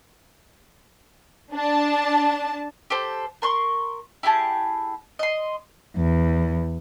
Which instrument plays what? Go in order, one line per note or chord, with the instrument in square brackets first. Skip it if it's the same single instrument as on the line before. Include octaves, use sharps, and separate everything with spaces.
[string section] D4 A5
[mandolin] G4 A4 C5
A#4 C6 C#6
E4 G4 G#4 A5
D#5 C6
[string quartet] E2